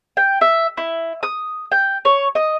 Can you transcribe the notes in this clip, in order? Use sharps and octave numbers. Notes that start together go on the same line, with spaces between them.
G5
E5
E4
D#6
G5
C#5
D#5